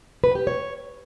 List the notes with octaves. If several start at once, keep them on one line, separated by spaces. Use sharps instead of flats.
B4
G4
C#5